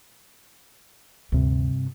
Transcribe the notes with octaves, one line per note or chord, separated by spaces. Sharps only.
D2 G2 C3